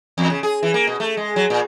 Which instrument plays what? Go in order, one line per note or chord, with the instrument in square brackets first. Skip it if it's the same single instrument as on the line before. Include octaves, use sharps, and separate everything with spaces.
[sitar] E2
C#3
G#4
E3
A#3
B2
A3
G#3
F#3
A#2